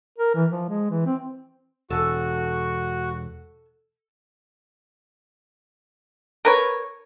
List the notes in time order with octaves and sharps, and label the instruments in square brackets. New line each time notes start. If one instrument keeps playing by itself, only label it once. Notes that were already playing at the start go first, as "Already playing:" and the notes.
[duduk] A#4
E3
F3
G#3
E3
C4
[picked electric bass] E1 [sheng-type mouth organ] F#4 [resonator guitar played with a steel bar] A4 G#5
[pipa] A#4 B4 C#5